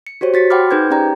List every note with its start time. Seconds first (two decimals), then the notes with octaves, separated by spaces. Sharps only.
0.07 C#7
0.21 F#4 G4 C5 C#5
0.34 F#4 A6 B6 C#7
0.50 F#5 G5 B5 C6 D6 F6
0.71 D#4 G#4 B4 C5 G6 G#6
0.90 C#4 G4 D5 G5 A#5